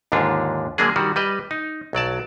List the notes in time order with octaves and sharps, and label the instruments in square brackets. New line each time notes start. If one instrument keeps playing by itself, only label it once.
[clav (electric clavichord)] D#2 G#2 D3 D4 F4
D3 F#3 G#3 A#3 D4 G#4
D#3 G3 F#4
G3 B4 D#5
D#4
B1 F#3 D5 A5